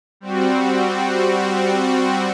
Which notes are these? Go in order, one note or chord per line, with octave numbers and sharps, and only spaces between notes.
G3 C4 F#4